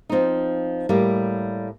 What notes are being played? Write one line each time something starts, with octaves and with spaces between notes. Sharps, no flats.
F3 C4 D#4
A2 G3 A#3